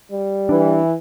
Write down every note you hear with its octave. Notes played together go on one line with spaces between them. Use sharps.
G3
E3 D4